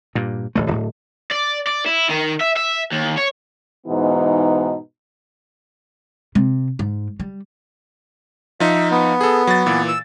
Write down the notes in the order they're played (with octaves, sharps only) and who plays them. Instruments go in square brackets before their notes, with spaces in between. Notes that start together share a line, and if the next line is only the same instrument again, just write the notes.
[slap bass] G2 A#2
D1 A1 A3
D1 A2
[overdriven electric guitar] D5
D5
E4
D#3
E5
E5
D#2
C#5
[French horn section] G#2 B2 E3 B3 D#4
[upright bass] C3
G#2
G3
[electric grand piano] F3 D#4 [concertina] E5
[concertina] B3
[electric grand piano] G#4 A4
F#3 A6
A#2 E3
[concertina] E6